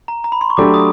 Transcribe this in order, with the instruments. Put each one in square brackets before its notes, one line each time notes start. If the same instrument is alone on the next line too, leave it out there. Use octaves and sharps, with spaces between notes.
[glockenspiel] A#5
A#5
B5
C6
C#6
[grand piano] F#3 A3 D4 G4 [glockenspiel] D6
[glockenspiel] D#6